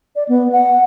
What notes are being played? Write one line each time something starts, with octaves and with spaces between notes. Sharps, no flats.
D5
B3
F#5